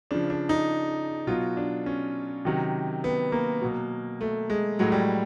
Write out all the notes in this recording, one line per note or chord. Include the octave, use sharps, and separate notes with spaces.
C#3 F3 D4
D4
D#4
B2 F#3 F4
D4
C#4
C3 D#3 F#3
B3
A#3
B2 F#3
A3
G#3
A2 F#3 G#3
G3